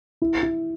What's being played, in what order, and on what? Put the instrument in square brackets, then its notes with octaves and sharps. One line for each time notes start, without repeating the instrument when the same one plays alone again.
[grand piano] E4
E4